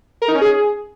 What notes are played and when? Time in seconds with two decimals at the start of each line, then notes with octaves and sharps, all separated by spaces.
0.22 A#4
0.28 D#4
0.35 C#4
0.41 G#4